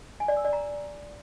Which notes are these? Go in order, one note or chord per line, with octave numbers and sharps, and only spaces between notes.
G#5
D5
E6
D5
A#5